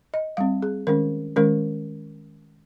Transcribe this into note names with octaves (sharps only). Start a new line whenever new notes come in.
D#5
G3 C4 F5
G#4
D#3 G#3 C#4 A#4
D#3 G#3 C#4 A#4